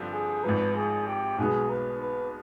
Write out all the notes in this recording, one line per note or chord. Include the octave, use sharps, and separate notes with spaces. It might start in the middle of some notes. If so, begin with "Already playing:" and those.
Already playing: G2 D3 F3 C4
G#4
G#1 G#2 F3 B4
G#4
G4
B1 B2 G#3 B3 G#4
B4
B4